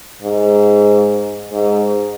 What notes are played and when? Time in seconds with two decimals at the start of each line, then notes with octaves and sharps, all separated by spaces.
0.23 G#2
1.52 G#2